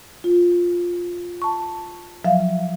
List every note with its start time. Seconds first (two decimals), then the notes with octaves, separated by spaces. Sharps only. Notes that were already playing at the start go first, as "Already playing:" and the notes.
0.24 F4
1.42 A5 C#6
2.25 F3 F#3 E5 F5